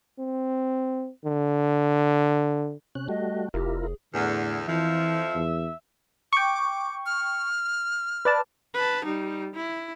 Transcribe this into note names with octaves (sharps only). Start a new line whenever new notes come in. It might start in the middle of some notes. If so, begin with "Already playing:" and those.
C4
D3
C3 C#4 F#6
G3 A3 F#4 D#5
F1 E4 F4 G4 A#4
G#4
E2 A2 D3
F2 E3 F3 E5
E2
G5 C#6 D6
F6
B4 D5 A5
B4 A5
G3 D#4
E4